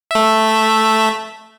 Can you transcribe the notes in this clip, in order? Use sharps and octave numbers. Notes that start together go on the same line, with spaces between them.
A3 E5